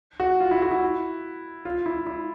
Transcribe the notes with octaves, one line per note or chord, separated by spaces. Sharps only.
F#4
F4
E4
F#4
E4
F4
E4
E4